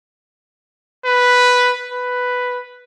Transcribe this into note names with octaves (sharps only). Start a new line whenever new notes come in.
B4
B4